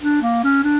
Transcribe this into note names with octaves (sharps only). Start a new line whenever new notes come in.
D4
A#3
C#4
D4